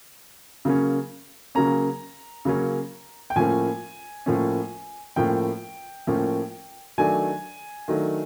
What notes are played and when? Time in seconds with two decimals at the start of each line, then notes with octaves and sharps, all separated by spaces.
0.65 C#3 F#3 A#3 C#4
1.55 C#3 F#3 A#3 C#4 A#5
2.45 C#3 F#3 A#3 C#4
3.30 G5
3.36 A2 F3 A#3 C#4 G#5
4.26 A2 F3 A#3 C#4
5.16 A2 F3 A#3 C#4 G5
6.07 A2 F3 A#3 C#4
6.98 D#3 F#3 A3 D4 G#5
7.88 D#3 F#3 A3 D4